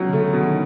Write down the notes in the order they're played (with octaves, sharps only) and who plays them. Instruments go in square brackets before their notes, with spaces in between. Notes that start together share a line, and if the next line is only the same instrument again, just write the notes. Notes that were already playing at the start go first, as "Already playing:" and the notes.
Already playing: [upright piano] C#2 B2 F#3
[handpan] D3
[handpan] C#3 [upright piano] A3
[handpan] D3
[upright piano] B2
[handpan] D#3